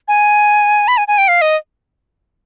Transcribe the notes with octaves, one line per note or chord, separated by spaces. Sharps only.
G#5
B5
G#5
G#5
G5
F5
D#5